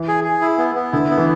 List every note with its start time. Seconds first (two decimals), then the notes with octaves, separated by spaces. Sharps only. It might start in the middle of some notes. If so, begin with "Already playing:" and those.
Already playing: E3
0.08 G#4
0.24 G#4
0.41 E4
0.58 B3
0.75 B3
0.92 D3 E4
1.10 B3
1.18 E3